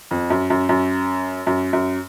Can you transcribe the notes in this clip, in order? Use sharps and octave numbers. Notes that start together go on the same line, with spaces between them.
F2
F#2
F#2
F#2
F#2
F#2